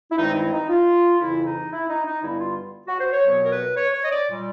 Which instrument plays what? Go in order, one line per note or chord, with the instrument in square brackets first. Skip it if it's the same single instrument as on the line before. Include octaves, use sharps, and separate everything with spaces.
[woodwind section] E4
G2 D#3 G#3 C4 D#4
E4
D#4
F4
F2 C#3 E3 E4
D#4
E4
D#4
D#4
G2 D3 G3 B3 E4
F4
F#4
C5
C#5
C2 B2 F#3 B3 C#5
A#4
B4
C#5
C#5
D#5
D5
A#2 G3